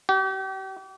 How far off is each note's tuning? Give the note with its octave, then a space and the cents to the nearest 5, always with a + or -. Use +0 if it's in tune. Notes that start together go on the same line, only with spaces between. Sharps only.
G4 -40